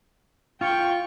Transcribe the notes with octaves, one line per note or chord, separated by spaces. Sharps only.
F4 G5 C#6